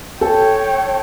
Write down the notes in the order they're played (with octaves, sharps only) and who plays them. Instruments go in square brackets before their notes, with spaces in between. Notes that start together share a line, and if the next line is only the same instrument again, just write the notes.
[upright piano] A4 [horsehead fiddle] C#5 G5